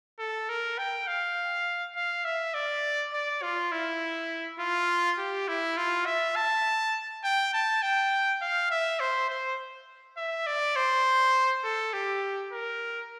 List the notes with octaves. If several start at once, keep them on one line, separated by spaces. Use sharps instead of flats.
A4
A#4
G5
F5
F5
E5
D5
D5
F4
E4
F4
G4
E4
F4
E5
A5
G5
A5
G5
F5
E5
C5
C5
E5
D5
C5
A4
G4
A#4